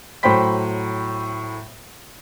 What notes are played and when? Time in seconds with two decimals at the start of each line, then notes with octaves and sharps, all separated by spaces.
0.23 A2 F#3 C5 G5 B5 B6